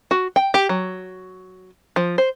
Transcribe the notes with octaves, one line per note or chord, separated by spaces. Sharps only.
F#4
G5
G4
F#3
F3
C5